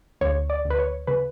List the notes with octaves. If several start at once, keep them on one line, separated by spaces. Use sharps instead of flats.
D2 C#5
D5
D2
B4
C#5
C#3 B4